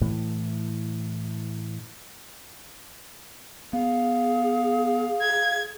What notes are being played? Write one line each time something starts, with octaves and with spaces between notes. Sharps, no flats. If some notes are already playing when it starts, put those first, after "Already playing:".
A2 E3
B3 G#4 F5
G#6